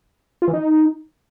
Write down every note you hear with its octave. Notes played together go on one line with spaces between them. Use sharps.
F4
E3
D#4